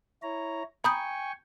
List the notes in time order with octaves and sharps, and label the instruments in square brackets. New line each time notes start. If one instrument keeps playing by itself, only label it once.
[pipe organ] E4 C#5 A#5
[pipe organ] G5 G#5 C#6 [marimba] A#5 D#6 G6 [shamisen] B5